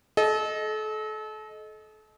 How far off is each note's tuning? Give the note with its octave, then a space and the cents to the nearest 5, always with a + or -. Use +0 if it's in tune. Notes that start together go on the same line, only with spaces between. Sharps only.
A4 -35 D#5 +0